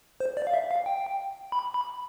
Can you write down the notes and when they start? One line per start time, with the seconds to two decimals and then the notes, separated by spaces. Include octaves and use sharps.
0.20 C5
0.37 D5
0.47 F5
0.53 E5
0.71 F5
0.86 G5
1.52 B5
1.74 B5